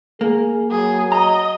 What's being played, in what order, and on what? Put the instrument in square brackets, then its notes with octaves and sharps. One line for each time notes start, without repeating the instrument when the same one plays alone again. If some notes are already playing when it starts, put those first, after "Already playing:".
[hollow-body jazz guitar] A#3 [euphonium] G#4
[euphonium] F#3 [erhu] G#4
[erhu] D#5 [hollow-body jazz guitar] A#5